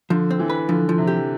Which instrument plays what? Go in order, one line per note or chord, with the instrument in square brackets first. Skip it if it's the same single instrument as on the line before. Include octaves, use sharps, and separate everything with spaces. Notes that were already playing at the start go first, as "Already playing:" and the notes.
[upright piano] D3 [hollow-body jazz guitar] F3
[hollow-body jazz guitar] C4
[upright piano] E3
[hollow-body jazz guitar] B4
[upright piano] D3 [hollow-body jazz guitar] F3
[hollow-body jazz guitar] F3
[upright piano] C3
[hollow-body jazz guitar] G4